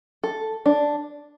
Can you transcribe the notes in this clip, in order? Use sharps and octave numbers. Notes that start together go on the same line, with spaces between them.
A4
D4